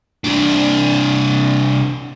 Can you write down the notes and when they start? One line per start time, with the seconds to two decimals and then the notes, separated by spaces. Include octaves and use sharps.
0.24 C2 D4